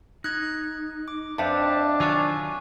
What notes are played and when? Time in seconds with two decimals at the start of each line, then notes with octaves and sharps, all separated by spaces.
0.24 D#4 F#6 G#6
1.08 D6
1.38 F2 D4 B4 C5 E5 A5
2.00 D#3 F#3 F4 G#5 A5 C#6